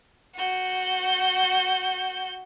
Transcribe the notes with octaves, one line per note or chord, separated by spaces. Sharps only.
F#4 G6